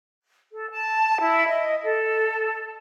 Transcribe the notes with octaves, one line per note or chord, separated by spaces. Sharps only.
A4
A5
E4
D#5
A4